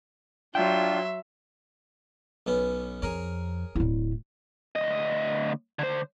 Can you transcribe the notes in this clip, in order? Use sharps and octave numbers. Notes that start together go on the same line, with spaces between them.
F#3 D4 F4 E5 G5 C6
B1 B3 C#4
F2 G#4 A#4 C#5
D1 E4
D2 D#5
D3 C5